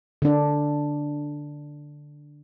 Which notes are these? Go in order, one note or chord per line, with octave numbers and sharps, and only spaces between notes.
D3 D4